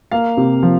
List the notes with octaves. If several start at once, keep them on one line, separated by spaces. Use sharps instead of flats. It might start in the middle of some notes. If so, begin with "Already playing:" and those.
A#3 F5
C3
F3